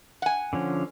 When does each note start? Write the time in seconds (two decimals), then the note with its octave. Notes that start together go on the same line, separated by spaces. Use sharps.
0.22 F#5 G#5
0.53 D3 F3 C#4